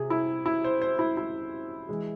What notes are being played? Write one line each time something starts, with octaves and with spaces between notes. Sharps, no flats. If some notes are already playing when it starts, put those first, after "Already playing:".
Already playing: C3 G#4
E4
E4
C5
C5
E4
E4
E3 G#3